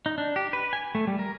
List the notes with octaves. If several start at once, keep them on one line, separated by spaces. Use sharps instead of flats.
D#4
D4
G4
B4
G#5
A3
G3
A#4